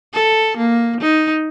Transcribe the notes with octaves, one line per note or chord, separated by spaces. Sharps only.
A4
A#3
D#4